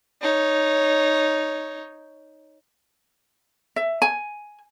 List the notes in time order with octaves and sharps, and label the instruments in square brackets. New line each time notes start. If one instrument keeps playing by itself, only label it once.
[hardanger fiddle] D#4 C#5
[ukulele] E5
G#5